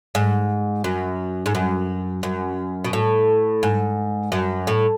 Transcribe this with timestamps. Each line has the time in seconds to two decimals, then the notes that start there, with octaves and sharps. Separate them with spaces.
0.15 G#2
0.84 F#2
1.46 G#2
1.55 F#2
2.23 F#2
2.84 B2
2.93 A2
3.63 G#2
4.32 F#2
4.67 A2